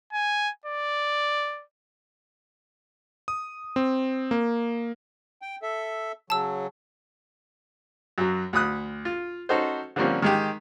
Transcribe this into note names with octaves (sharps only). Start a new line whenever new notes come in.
G#5
D5
D#6
C4
A#3
G5
A4 E5
C#3 F#3 A5 E6
F#2 F#3
D2 B5 D#6 F#6
F4
C#4 D#4 F#4 A4 C5
D3 F3 G3 A#3 C4 C#4
D#3 G#3 G4